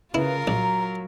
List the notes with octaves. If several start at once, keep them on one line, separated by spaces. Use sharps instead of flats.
C#3 E4 F4 A#4 B4
A#1 F#3 A#5